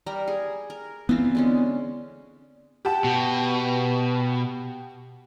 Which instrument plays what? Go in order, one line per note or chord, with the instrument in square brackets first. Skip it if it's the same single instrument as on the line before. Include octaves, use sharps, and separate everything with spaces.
[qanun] G3 A#4 A#5
G#4
A#4
[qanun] E3 F4 [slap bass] B3 C4
[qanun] D3 G#3 C#4
[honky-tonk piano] G4 F#5 A5
[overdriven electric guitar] B2